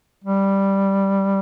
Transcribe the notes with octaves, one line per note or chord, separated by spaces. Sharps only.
G3